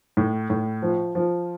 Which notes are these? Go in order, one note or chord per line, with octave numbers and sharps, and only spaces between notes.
A2
A2
F3
F3